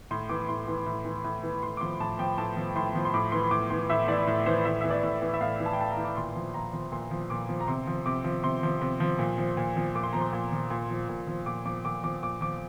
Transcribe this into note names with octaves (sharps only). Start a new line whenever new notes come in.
A2 C6
E3 D6
A2 C6
E3
A2
E3
A2
E3
A2 C6
D6
F3 C6
A2 A5
F3 G5
A2 A5
F3
A2 C6
F3
C6
A2 D6
E3 C6
A2 D6
E3 C6
A2 E5
E3 D5
A2
E3 C5
A2 E5
E3 E5
D5
A2
E3
E5
A2 F5
E3
A5
G5
A2 A5
A#5
E3
D6
A#2 C6
F3
A#2 A#5
F3
A#2 C6
F3
A#2 D6
F3
A#5
C3 C6
F3
C3 D6
F3
C3 C6
F3
C3
F3
A#2
F3
A#2
F3
A#2 D6
C6
F3 A#5
C6
A#2
F3
A#2
F3
A#2
F3
A#2 D6
F3 D6
A#2 D6
F3 D6
A#2 D6
F3 D6